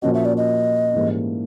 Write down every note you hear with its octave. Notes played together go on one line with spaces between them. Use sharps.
A#2 F3 A#3 C#4 F#4 D#5
E5
D5
D#5
G#2 E3 G3 A#3 C#4